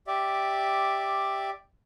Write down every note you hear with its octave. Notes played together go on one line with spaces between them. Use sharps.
G4 D5 E5